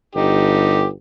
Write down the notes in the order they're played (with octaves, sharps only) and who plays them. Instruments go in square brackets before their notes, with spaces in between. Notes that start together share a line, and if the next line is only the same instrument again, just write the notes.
[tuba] G1 [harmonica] D#4 G4